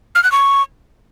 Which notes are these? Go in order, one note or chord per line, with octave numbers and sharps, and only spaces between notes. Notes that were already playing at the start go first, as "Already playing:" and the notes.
F6
F#6
C#6